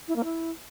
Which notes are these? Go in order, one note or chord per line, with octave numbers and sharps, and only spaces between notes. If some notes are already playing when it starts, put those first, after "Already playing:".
E4
A#3
E4